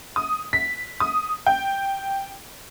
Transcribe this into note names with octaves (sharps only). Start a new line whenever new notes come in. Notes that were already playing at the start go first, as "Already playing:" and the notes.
D#6
B6
D#6
G5